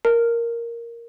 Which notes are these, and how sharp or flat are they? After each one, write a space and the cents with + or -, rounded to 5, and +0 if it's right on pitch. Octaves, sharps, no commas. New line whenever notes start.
A#4 +0 A5 +35